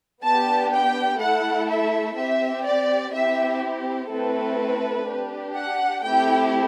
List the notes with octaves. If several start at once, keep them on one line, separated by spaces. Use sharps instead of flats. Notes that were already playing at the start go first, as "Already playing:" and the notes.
B3 D4 G4 A5
G5
A3 E4 A4 F#5
E5
C4 G4 E5
D5
C4 E4 G4 E5
A3 C4 E4 A4 B4
D4 G4
F#5
A3 C4 E4 G4 G5